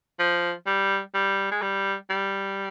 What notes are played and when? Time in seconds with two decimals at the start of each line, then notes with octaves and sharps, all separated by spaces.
0.20 F3
0.67 G3
1.14 G3
1.52 G#3
1.62 G3
2.10 G3